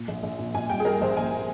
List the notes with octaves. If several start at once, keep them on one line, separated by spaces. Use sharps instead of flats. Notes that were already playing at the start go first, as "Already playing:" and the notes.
Already playing: A#2
A#1
A#1
A#2
A#2 G#5
G3 G5
G#4
G3 A#4
A#1 C5
A#1 G#5